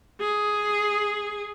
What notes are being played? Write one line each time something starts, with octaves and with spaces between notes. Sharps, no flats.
G#4